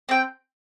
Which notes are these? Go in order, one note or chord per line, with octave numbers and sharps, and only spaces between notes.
C4 G5